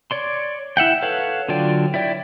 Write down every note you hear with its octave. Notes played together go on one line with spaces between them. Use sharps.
C#5 D5 C6
E4 E5 F#5 G5
A4 B4 C#5 F5 F#5
D3 F#3 F4 D5 G5
E4 C#5 D5 G5